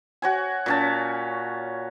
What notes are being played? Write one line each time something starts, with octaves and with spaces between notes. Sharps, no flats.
F#4 C#5 G#5
A#2 C#4 A5